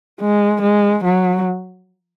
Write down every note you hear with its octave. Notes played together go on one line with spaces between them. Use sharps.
G#3
G#3
F#3